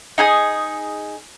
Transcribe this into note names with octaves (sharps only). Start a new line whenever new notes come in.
D#4 G#4 D#6